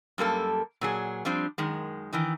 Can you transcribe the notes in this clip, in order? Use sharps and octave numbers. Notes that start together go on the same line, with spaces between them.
F#2 G3 A#3 A4
A#2 F#3 G#4
F3 G3 C4 D4
F#2 D#3 G#3
D#3 E3 D#4